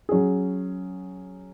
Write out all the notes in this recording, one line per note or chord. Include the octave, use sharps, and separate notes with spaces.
F#3 C#4 G#4